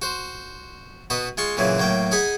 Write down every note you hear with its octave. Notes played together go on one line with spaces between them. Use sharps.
F#4 C5
B2 F#4 B4 D#5
G#3 F4 C6 C#6
A#2 C#3 E3 F#3 C4
A2 F#3 A#3 G5
D#4 G#4 F#5 G#5 B5